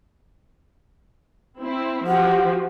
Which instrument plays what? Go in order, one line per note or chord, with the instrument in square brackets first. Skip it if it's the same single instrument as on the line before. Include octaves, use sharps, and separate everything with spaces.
[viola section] C4 E4
[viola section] F3 F#4 G4 [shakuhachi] F#5